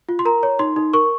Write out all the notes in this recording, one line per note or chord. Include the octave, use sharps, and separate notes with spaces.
F4
C6
A#4 A#5
C#5
D#4 C6
D#4
A#4 C#6